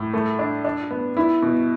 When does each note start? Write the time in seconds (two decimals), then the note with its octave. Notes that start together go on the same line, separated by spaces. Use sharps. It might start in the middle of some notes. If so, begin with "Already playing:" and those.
Already playing: A2
0.14 A3
0.39 D4
0.65 D4
0.91 B3
1.17 E4
1.42 B2